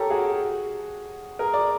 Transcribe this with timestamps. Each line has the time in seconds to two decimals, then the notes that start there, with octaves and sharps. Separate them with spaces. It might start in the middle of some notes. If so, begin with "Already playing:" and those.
Already playing: G4 A4 A#4 C#5
0.10 F#4 G#4
1.39 G#4 A#4
1.54 D5